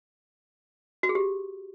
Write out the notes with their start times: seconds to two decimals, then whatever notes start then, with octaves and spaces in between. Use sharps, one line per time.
1.03 F#4
1.09 G#4
1.15 G4